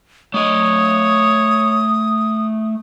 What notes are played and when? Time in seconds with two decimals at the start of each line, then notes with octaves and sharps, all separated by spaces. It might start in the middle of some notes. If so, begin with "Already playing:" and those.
0.34 A3 C#5 D#5 D#6